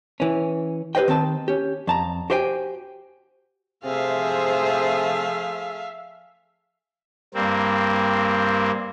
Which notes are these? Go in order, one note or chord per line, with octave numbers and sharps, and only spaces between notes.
E3 C#4
G4 B4 C5 D#5 G5
D#3 C4 G5 A5
C#4 G4
F2 A5 A#5
F#4 G4 C5 E5 G5 G#5
C3 F3 A3 G#4 C5 E5 F5
G2 A#3 C4